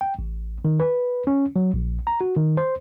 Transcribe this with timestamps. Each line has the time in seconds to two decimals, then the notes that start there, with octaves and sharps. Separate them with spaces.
0.01 G5
0.19 A1
0.65 D#3
0.80 B4
1.27 C#4
1.56 F#3
1.74 A#1
2.07 A#5
2.21 F#4
2.37 D#3
2.57 C5